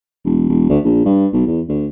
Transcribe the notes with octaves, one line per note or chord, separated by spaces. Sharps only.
E1
E1
D2
A#1
G2
B1
E2
D2